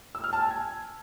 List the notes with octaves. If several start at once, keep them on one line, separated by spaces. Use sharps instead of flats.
E6
F6
A5
G#5
G#6